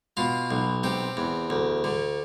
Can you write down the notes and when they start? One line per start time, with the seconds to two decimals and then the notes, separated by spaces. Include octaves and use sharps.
0.17 B2 F4
0.51 B1
0.83 C3 G4
1.17 E2
1.50 D2
1.84 D3